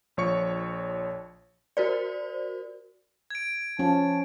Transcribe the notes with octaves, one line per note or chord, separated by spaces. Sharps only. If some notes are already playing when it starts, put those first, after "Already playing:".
A#1 F3 C#5 C#6 C#7
F#4 A#4 C5 D5
G#6 D7
F3 C#4 A5